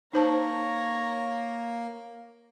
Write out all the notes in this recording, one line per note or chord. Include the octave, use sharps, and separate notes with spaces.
A#3 D#4 C5 C#5 A5 A#5